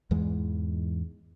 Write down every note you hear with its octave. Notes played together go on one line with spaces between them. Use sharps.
E2 G#2 E3 G#3